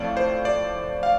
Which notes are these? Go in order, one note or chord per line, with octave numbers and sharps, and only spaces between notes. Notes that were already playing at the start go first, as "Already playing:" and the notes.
Already playing: A2 F3 A3 C4 D5 F5
C5
D5
F5